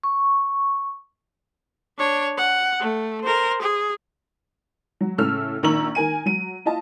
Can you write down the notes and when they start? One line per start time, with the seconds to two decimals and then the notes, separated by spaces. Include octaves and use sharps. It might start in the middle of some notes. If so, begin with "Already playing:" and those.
0.03 C#6
1.98 D4 C#5
2.38 F#5
2.80 A3
3.24 A#4 C5
3.61 G#4
5.01 F#3
5.18 A2 C#3 A3 C#4 E6 F6
5.63 A#1 D#3 A#5 C#6 E6 F#7
5.95 D#3 A#4 G#5 D#7
6.26 F#3 D#7
6.65 E4 F4 D#5 A5